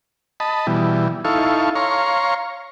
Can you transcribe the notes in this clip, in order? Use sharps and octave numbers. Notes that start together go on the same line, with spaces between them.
D#5 A5 B5
B2 E3 G3
D#4 E4 A4 F5 C#6
C#5 F5 A#5 C6 C#6